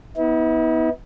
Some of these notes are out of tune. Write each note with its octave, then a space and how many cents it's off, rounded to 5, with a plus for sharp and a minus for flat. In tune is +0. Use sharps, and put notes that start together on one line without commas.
B3 +0 E4 -45